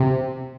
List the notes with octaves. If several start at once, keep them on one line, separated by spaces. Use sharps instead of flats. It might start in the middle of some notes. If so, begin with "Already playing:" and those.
Already playing: C3